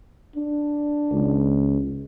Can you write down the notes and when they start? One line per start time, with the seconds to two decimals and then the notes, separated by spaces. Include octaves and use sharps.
0.36 D4
1.13 C#2